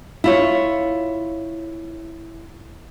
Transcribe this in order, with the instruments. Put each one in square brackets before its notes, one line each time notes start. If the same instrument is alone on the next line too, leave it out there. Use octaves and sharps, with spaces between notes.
[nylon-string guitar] E4 F4 C#5